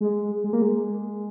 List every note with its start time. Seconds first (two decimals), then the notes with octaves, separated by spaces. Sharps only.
0.01 G#3
0.44 G#3
0.53 A#3
0.62 G#3